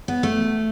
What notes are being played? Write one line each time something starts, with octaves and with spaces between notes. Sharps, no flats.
B3
A3